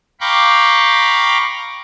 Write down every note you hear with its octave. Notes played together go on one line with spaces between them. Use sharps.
F5 G5 A#5 B5 C#6 D6